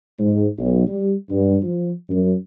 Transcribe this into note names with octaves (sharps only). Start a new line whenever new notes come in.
G#2
B1
G3
G2
F3
F#2